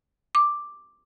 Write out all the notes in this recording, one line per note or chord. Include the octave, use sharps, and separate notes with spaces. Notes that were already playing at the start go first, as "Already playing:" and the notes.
D6